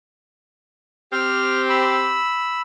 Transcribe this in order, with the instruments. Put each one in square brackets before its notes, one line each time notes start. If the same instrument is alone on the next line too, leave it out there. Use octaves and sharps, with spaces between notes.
[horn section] C4 G4 [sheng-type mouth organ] F6
[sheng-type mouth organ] B5 E6